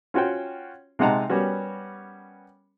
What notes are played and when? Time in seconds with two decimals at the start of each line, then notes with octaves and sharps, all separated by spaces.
0.14 C#4 F4 F#4 C5 G5
0.99 C3 G#3 D#4 F#5 A5 A#5
1.29 G3 B3 C#4 F#4 A#4